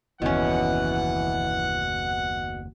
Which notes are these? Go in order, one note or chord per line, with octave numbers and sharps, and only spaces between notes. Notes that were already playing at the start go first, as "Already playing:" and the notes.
F#1 D#2 B2 E3 C#4 F#5